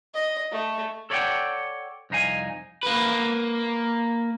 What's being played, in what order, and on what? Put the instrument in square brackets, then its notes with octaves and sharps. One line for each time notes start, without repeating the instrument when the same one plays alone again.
[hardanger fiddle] D#5
A3
[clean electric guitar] A4 C#5 D5 E5 F#5 G5
C2 F2 D#4 F5 G#5
[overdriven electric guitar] A#3 B4